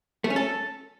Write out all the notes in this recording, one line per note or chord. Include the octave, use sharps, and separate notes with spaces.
A3
C#4
A4